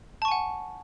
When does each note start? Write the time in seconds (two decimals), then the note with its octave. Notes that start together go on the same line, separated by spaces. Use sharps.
0.22 A5
0.25 C#6
0.28 G#5
0.32 F#5